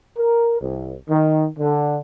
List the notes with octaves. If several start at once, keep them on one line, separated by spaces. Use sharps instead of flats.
A#4
C2
D#3
D3